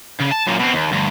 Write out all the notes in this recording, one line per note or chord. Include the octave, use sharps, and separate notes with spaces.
C#3
A5
F#2 A#2
B2 C4
D#2
D2 G2